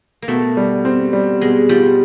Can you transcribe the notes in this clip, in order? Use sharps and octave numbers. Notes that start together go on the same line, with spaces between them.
A#3
B2 A3
G3
C4
G3
B2 G#3
G3 F4